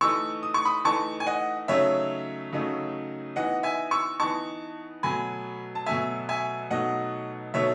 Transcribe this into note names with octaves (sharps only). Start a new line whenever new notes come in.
E3 A3 D#4 C#6 E6
D#6
C#6
B5 D#6
E3 A3 D#4 A5 C#6
G#5
D#5 F#5
C#3 F#3 A3 D#4 C#5 E5
C#3 F#3 A3 D#4
E3 B3 D#4 D#5 F#5
E5 G#5
C#6 E6
E3 B3 D#4 A5 C#6
B2 F#3 A3 G#5 B5
A5
B2 F#3 A3 E5 G#5
E5 G#5
B2 F#3 A3 D#4 D#5 F#5
B2 F#3 A3 D#4 C#5 E5